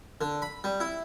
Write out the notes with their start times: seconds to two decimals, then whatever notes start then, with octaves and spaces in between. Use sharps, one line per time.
0.21 D3
0.42 B5
0.64 G3
0.80 E4